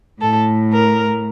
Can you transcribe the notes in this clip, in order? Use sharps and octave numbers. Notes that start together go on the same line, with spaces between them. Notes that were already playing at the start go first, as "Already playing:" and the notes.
A2 A4
A#4